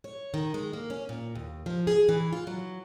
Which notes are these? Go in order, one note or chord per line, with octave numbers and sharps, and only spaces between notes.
C#5
D#3
G#3
A#3
C#4
A#2
D#2
F3
G#4
E3
F4
F#3